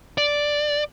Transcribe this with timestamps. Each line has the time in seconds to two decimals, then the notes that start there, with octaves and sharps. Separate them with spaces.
0.18 D5